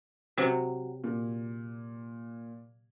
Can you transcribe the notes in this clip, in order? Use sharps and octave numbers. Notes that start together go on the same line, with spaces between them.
C3 F#3
A#2